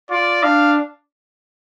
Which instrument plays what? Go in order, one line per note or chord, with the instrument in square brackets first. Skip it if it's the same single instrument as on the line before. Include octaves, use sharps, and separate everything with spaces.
[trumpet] F4 [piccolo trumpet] D5
[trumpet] D4 [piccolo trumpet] F5